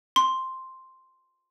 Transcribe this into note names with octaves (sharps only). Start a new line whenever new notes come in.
C6